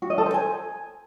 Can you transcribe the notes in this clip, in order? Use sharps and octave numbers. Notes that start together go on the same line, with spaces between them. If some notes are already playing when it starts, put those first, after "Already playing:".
F#4
D#5
A4
C5
G#5